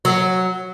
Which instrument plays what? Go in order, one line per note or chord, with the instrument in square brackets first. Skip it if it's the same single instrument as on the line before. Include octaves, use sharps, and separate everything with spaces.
[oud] F#3